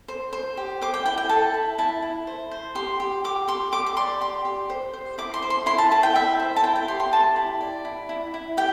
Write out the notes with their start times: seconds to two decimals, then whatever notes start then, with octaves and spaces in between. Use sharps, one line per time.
0.08 C5
0.33 C5
0.57 G4
0.81 C5 D6
0.94 G5
1.06 E4 G5
1.18 G5
1.29 A4 A5
1.54 E4
1.78 E4 A5
2.02 E4
2.27 C5
2.51 C5
2.75 G4 C6
3.00 G4
3.24 G4 D6
3.48 G4 C6
3.72 G4 D6
3.86 D6
3.97 D5 C6
4.21 G4 C6
4.45 G4
4.70 C5
4.93 C5
5.18 E4 D6
5.34 C6
5.42 C5
5.50 C6
5.66 E4 C6
5.78 A5
5.91 E4 A5
6.03 G5
6.15 E4 E5
6.39 C5
6.56 A5
6.63 E4 G5
6.76 G5
6.88 G4 C6
7.00 C6
7.12 G4 A5
7.36 E4
7.61 D5
7.85 E4
8.09 E4
8.34 E4
8.57 G4 G5